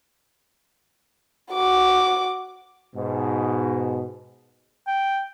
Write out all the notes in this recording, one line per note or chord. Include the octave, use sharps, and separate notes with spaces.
F#4 D6
G#2 B2
G5